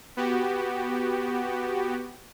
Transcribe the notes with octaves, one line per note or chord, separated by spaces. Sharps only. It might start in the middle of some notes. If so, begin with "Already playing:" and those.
B3 F#4 G4